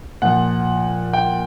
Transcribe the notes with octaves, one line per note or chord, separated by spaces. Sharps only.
A#2 F3 F#5
G5